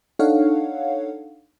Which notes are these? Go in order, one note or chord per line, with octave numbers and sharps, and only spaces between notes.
D4 D#4 A4 C#5 F5 F#5